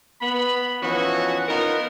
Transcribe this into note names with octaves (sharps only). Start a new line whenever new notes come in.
B3 B5
E3 F3 B3 C#4 D#4 F#4
B3 D#4 F4 A#4